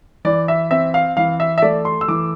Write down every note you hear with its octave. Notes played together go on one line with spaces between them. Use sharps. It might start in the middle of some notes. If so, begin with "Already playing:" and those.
E3 D5
E5
C4 E5
F5
E3 F5
E5
E5
A3 D5
C6
E6
E3 D6